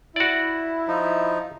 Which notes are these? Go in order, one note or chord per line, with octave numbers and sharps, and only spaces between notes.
E4 F#4 D5
F3 D#4